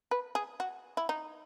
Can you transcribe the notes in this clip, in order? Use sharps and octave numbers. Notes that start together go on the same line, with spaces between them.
B4
G#4
F#4
E4
D#4